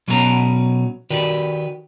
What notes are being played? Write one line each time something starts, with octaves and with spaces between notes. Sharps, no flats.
B2 F#3 B3 C#4 A4 A#5
D#3 F#4 G4 B4 D5